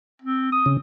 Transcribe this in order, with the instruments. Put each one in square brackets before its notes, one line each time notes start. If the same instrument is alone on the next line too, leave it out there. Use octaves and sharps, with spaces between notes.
[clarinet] C4
D#6
[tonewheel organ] C#3